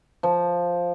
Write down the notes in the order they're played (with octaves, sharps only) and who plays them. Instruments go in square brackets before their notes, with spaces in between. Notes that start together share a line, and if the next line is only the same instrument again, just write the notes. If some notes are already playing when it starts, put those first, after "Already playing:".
[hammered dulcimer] F3